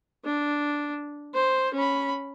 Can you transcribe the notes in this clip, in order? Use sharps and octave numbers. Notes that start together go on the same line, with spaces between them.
D4
C5
C#4 B5